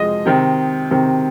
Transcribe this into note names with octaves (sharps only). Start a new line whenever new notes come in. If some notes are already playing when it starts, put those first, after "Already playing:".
Already playing: F2 F3 G#3 C4 D#5
C3 D#3 C4
C3 D#3 C4